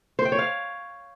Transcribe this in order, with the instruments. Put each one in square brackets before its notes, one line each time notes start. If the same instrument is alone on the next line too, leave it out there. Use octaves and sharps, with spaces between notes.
[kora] C5
G5
C#5
F5